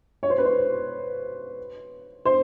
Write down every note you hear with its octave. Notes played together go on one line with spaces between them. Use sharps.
C#5
C5
B4
C5
C5